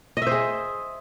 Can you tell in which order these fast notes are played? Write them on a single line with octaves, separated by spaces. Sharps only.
D#5 E5 C5 G#4